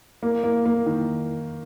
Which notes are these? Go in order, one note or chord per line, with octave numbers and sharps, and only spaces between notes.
A#3
A#3
A#3
D#3